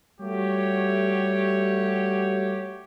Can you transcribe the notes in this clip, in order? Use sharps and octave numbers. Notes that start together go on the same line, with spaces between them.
G3 A3 F#4 G4 C#5